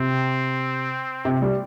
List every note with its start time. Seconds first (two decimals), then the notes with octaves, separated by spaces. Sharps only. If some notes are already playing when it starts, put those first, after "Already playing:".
Already playing: C3 C4
1.25 C3
1.42 G3